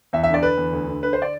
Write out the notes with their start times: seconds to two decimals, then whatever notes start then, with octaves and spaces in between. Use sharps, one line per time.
0.13 E2 E5
0.23 E5
0.29 D3
0.34 D5
0.43 D3 B4
0.57 E2
0.73 D2
0.88 D3
1.03 D3 B4
1.13 C5
1.22 D5